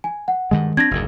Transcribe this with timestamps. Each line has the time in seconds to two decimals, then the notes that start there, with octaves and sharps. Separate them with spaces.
0.04 G#5
0.28 F#5
0.51 G2 D#3 G#3
0.77 C4 D4 G#6 A#6
0.91 F#1 D2 G#2